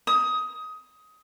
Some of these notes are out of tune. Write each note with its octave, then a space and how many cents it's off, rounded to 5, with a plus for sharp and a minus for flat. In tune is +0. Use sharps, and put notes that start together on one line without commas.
D#6 +15